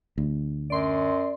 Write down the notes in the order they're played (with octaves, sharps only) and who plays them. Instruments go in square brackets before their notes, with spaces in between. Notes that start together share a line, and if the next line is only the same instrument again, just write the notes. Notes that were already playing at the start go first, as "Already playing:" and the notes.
[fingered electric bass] D2
[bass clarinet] F#2 [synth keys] D5 C6